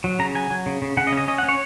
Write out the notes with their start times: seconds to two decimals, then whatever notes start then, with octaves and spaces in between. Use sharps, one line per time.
0.04 F#3
0.19 C#3 A#5
0.35 F#3 G#5
0.50 F#3
0.66 C#3
0.82 C#3
0.97 C#3 F#5
1.07 D#5
1.12 C#4
1.17 D#5
1.28 C#4 D#5
1.38 F#5
1.43 C#4
1.49 C#5